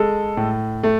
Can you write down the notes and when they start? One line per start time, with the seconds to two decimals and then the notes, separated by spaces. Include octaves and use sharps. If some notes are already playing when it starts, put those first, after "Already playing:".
Already playing: G#3 A4
0.37 A2
0.83 A3